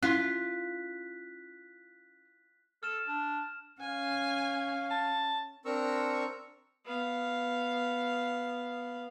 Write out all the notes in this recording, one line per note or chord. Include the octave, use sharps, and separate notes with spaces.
C#4 E4 F4 C6 F#6 B6
A4 F6 E7
D4
C#4 F5 G#5
A5
C4 D4 A#4 A#5 C#6 E6
B3 F5